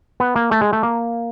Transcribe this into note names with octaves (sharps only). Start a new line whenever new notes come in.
B3
A#3
A3
G#3
A3
A#3